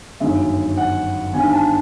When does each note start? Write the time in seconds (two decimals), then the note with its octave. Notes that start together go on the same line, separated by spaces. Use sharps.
0.20 G1 F#2 D#3 G#3 E5
0.77 F#5
1.33 G1 G2 D#3 G#5
1.52 A5